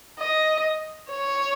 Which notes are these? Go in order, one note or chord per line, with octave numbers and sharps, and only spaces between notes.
D#5
C#5